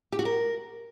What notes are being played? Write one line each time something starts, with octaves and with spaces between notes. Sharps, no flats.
G4
F#4
A#4